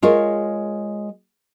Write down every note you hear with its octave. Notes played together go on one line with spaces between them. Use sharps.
G#3 F4 A#4 C#5